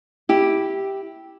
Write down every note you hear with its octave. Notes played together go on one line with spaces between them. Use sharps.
E4 G4